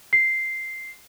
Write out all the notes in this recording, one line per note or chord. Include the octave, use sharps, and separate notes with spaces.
C7